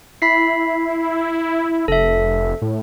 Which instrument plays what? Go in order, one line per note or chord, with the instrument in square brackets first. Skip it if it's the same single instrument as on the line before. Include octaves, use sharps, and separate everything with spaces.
[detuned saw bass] E4 [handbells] B5 B6 C7
[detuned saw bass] F1 [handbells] A4 E5
[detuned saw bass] A2